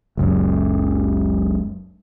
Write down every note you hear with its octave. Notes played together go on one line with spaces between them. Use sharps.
F#1 C#2 F#2